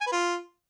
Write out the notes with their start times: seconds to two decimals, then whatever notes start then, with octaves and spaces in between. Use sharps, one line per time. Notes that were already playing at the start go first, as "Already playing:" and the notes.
0.01 G#5
0.07 B4
0.12 F4